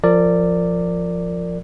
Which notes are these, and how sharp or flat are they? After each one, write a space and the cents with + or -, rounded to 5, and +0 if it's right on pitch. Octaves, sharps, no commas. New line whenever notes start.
F3 +0 A#4 -30 D5 +0